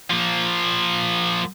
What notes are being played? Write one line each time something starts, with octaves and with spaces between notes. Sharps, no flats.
F3 A#3